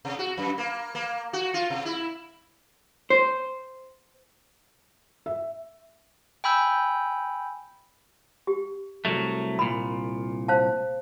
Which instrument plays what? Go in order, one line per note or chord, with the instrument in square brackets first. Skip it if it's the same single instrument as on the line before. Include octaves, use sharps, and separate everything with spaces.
[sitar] C3
F#4
F#2
A#3
A#3
F#4
F4
C3
E4
[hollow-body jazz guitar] C5
[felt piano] E5
[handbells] G5 G#5 B5 E6 G6
[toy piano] G4
[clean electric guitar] C2 F#3 A3
[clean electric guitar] C2 A#2 [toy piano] B5
[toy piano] C5 F5 A5